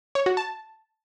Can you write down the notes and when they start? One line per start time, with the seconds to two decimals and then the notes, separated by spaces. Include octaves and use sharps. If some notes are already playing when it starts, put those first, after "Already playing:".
0.15 C#5
0.26 F#4
0.37 A5